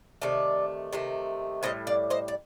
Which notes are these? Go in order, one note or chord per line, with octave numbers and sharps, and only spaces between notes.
C3 D#3 A3 D5
C3 D#3 A3
A2 G3 C5 D#5
D5 F5
C5 D#5
D5